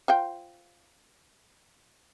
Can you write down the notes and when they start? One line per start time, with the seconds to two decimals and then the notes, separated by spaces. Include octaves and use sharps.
0.08 F4 C5 G5